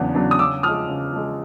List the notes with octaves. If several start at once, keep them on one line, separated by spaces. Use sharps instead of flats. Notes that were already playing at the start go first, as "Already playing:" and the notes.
Already playing: E2 C#3 F#3 B3 D4
C#3 F#3 B3 D4
D#6
C#3 D6 E6
F3 G#3 D#6 F6
C#3
F3 G#3